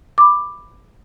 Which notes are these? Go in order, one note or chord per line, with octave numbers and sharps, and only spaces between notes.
B5 D6